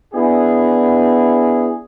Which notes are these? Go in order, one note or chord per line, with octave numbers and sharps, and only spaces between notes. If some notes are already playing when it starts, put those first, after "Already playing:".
B3 D4 E4 G#4